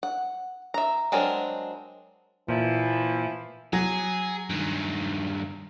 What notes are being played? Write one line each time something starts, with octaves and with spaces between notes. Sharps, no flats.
F#5
E5 A#5
F#3 G#3 C4 D4 A#4
A#2 E3 F3 E4
F#3 G#4
G2 D#3